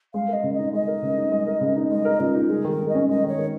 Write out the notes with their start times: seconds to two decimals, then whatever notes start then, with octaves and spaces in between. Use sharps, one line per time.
0.14 G#3 F5
0.28 A#4 D#5
0.43 C#3
0.54 D#4 D#5
0.73 G#3 D#5
0.88 A#4
1.02 C#3
1.17 D#4
1.32 G#3
1.47 A#4
1.61 C#3
1.76 D#4
1.91 G#3 D#5
2.05 A#4
2.20 C#3 F4
2.35 D#4
2.49 G#3 G#4
2.64 D#3
2.70 A#4
2.79 D#3
2.89 D#5
2.95 C#4
3.09 G#3 D#5
3.23 D#3 C#5
3.38 D#3